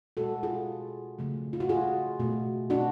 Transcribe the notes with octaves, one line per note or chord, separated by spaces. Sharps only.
B2 G#3 F#4 A4
F4 G#4
C#3 F3 A3
F4
F#4
F4 G#4
B2 A3
D4 F#4